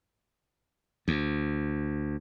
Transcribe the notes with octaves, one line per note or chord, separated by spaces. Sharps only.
D2